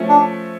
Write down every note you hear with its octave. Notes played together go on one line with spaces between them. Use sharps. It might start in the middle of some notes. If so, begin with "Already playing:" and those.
Already playing: F3 A3 C#4
D4